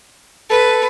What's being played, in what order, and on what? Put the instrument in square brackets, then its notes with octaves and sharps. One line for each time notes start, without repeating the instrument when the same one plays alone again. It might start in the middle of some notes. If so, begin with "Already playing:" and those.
[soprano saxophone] A4 [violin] B4